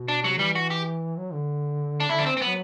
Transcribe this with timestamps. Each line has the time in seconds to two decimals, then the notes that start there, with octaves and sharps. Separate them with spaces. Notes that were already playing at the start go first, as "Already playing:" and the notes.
Already playing: B2
0.08 D4
0.24 C3 F#3
0.39 E3 G3
0.55 F#4
0.70 G4
1.17 F#3
1.33 D3
2.00 D4
2.09 D3 E4
2.19 D4
2.26 C4
2.37 C4
2.41 F#3 B3